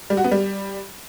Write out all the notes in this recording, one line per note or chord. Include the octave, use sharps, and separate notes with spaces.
G3
F#4
B3
G3